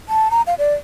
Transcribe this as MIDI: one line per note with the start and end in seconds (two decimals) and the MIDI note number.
0.09 0.31 81
0.31 0.42 82
0.47 0.54 77
0.59 0.73 74